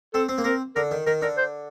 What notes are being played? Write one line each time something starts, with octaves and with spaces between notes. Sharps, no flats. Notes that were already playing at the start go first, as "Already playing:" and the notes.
C4 A4
C4
A#3
C4 A#4
D3 A#4
D#3
D#3 A#4
D3 A#4
C5